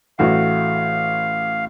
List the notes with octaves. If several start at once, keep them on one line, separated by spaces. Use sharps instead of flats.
A1 A3 F#4 F5